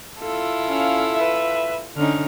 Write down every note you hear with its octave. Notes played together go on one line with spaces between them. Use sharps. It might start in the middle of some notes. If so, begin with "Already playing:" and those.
E4 F4 A4
C#4 F5
B4 E5
D3 C#4 D#4 F6